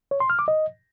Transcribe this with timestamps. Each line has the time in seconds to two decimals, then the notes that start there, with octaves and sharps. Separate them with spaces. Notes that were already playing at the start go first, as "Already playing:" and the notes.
0.11 C#5
0.20 C6
0.30 F6
0.39 D6
0.48 D#5